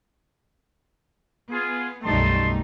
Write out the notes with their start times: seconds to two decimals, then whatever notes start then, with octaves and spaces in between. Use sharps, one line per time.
1.51 B3 F4 G#4
2.04 B1 F#2 G3 A3 D#4 A5 C6